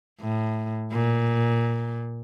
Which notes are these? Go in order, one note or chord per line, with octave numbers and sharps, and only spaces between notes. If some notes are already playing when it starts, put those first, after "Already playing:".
A2
A#2